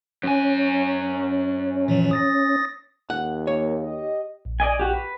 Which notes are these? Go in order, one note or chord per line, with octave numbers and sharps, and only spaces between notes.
F#2 C#4 G#5
A#2 E3 F3
D#6 A6 A#6
D#2 F#5
A#3 C#5
G4 D#5
A#1
D5 D#5 G#5
F#4 G4
B4